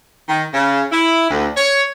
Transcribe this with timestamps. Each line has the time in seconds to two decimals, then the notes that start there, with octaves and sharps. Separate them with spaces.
0.29 D#3
0.54 C#3
0.92 E4
1.31 D2
1.57 C#5